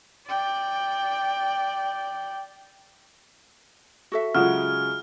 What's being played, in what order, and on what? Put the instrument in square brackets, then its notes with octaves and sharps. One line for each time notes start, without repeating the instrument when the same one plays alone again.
[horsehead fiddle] D5 G5
[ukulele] F#4 A4 E5
[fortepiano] C#3 F#3 G#3 [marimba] F4 F#5 [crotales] F6